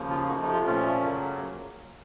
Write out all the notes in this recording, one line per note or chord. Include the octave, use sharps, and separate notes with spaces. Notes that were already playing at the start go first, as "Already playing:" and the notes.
Already playing: D#2 C#3 F3 A#3
F4
F2 C3 F3 D#4 F#4
D#4
F4
A#2 F3 A3 C#4 F4
F#2 C#3 F#3 A#3